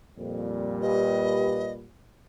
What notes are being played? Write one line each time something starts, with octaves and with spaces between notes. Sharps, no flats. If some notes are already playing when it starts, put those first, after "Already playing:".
F2 A#2 G3
G4 B4 D#5